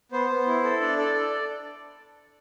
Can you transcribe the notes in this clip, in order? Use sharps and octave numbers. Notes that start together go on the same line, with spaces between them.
B3 C5
B3
E4
A4
D4 D5
A4 D5
A4